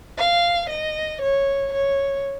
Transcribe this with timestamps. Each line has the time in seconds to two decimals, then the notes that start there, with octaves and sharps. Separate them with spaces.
0.18 F5
0.69 D#5
1.21 C#5
1.73 C#5